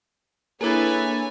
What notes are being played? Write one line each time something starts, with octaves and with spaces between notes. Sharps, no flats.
A#3 D4 E4 G#4 A4 B4 C#5 G#5